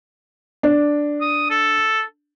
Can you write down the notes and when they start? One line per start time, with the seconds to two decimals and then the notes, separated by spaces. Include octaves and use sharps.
0.63 D4
1.21 D#6
1.50 A4